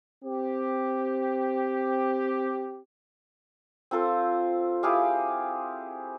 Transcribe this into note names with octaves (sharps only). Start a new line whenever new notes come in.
C4 G4
C4 F4 A4 C5
E4 G4 G#4 F5